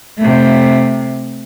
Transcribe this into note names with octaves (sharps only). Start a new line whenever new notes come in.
C3 A3